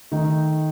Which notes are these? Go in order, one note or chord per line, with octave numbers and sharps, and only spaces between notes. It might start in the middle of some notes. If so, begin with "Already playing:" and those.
D#3 A3 D#4